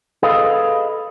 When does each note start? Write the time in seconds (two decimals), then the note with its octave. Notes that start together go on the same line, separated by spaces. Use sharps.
0.23 G#4 A4 B4 D#5 F5